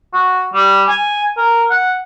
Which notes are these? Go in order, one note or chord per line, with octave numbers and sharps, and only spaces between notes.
F#4
G3
G#5
A#4
F#5